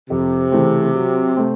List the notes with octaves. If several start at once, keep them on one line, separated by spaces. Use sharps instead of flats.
F2 C3
C#3 E3 A3 C4
F#3
A3 C4